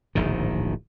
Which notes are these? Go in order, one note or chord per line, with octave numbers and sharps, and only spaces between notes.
D1 A#1 G#2 D#3